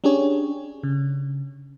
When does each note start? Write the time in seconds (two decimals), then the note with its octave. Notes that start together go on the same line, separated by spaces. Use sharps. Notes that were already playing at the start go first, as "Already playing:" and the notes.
0.04 C#4 D4 G4 G#4 C#5
0.83 C#3